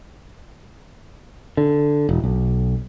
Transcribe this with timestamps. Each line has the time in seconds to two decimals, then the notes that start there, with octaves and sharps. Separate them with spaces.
1.57 D3
2.09 E1
2.24 B1